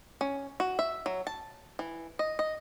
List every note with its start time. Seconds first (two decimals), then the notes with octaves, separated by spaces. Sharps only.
0.21 C#4
0.60 F#4
0.79 E5
1.06 F#3
1.27 A5
1.79 E3
2.19 D#5
2.39 D#5